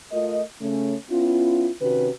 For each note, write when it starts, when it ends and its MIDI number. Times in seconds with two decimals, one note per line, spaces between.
0.11 0.41 57
0.11 0.41 65
0.11 0.41 70
0.11 0.41 75
0.61 0.94 49
0.61 0.94 57
0.61 0.94 61
1.09 1.69 59
1.09 1.69 61
1.09 1.69 64
1.09 1.69 65
1.80 2.09 48
1.80 2.09 51
1.80 2.09 61
1.80 2.09 66
1.80 2.09 71